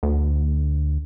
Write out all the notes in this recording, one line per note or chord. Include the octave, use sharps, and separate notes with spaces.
D2